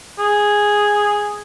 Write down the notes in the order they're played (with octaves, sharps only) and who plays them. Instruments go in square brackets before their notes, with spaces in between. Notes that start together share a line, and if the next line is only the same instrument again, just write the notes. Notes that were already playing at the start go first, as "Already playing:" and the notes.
[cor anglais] G#4